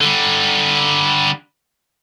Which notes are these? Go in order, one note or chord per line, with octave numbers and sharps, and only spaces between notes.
D3 G3